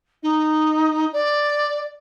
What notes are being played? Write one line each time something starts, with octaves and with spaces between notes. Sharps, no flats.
D#4
D5